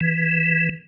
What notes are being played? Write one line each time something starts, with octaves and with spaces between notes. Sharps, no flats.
E3